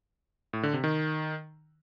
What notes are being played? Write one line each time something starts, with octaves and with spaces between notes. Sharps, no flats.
A2
D3
C3
D#3